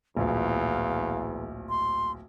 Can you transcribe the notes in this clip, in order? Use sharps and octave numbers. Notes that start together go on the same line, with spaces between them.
D1 A#1 E2 F5
C6